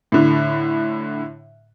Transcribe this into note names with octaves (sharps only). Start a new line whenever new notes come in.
A2 D3